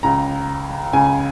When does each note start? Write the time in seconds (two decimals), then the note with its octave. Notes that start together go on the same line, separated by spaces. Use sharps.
0.03 C#2 C#3 A#5
0.93 C#2 C#3 G#5